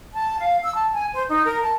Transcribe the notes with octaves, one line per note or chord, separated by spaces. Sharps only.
A5
F5
E6
A5
G#5
C5
D#4
A#4
A5